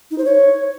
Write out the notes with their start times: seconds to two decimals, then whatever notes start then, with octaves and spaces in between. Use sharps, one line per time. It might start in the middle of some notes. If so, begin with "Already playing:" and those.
0.11 D#4
0.18 C5
0.25 C#5